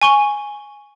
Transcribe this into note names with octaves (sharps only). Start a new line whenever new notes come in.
G#5 C#6 G7